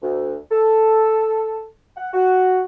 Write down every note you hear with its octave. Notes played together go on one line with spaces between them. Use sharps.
D2
A4
F#5
F#4